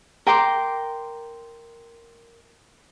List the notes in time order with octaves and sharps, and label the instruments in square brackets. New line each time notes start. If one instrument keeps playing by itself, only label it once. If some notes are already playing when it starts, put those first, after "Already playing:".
[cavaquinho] A#4 G5 C6 D6